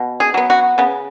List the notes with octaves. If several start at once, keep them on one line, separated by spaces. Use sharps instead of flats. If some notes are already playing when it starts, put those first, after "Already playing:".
Already playing: B2
G#4
F#3 B3
F#4
C#3 B3